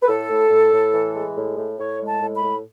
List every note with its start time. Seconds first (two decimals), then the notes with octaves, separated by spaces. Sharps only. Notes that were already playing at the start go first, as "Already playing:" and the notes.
0.02 B4
0.08 A2 A4
0.30 A2
0.50 A2
0.73 A2
0.94 E3
1.14 G#3
1.36 A2
1.57 A2
1.78 A2 C#5
2.00 G#3
2.07 A5
2.22 A2
2.36 B5
2.43 A2